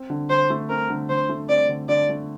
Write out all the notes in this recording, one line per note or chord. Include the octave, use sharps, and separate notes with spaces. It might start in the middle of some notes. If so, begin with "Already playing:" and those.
Already playing: C4
D3
D3 C5
A3
C4 A#4
D3
D3 C5
A3
C4 D5
D3
D3 D5
A3